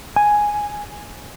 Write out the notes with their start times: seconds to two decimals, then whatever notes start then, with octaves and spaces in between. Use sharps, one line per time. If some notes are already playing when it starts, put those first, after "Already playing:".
0.16 G#5